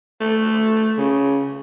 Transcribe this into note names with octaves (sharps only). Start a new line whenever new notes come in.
A3
C#3